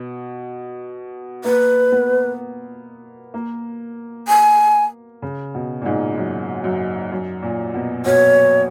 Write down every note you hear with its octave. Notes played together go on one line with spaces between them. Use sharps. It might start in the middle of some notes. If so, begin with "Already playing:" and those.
Already playing: B2
A#3 B4
B3
A#3
G#5
C#3
B2
A#2
G#2
F#2
F#2
F#2
A#2
B2
B2 C#5